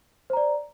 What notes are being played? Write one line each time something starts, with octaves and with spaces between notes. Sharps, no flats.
C5 D5 A#5